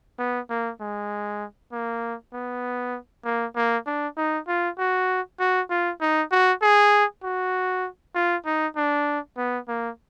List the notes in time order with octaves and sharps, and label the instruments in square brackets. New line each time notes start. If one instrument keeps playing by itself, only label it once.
[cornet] B3
A#3
G#3
A#3
B3
A#3
A#3
D4
D#4
F4
F#4
F#4
F4
D#4
F#4
G#4
F#4
F4
D#4
D4
B3
A#3